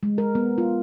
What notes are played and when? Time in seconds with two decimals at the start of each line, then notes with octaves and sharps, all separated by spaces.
0.03 G#3
0.18 A#4
0.35 B3
0.58 F4